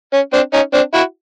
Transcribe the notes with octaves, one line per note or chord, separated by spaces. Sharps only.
C#4
C4 D4
C#4 D#4
C4 D4
E4 F#4